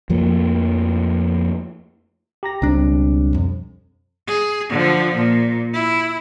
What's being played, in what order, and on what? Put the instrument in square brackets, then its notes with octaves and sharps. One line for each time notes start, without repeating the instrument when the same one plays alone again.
[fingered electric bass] F2 F3 A3 A#3
[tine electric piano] G4 A#5 A#6
[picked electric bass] C#2 D4 [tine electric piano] B2 G3 C4
[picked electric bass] F2
[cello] G#4
D3 F3
A#2
E4